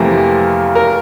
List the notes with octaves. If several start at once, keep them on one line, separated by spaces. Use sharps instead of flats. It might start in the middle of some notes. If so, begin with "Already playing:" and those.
Already playing: F2 C3 E3 A3 A#3 A#4
A#4